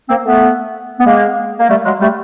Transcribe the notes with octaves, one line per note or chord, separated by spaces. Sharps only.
A#3 C4
A3 B3
B3
G#3 A#3
A#3
G3 A3
F#3 G#3
G3 A3